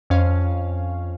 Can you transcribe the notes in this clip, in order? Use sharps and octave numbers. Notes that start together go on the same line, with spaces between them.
F2 C#4 F5